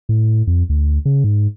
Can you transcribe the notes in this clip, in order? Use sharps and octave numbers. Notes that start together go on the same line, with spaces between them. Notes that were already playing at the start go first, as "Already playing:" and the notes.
A2
F2
D2
C#3
G#2